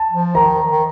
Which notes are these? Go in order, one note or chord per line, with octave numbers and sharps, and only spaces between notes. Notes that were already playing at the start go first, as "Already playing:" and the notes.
Already playing: A5
F3
D#3 A#5
D#3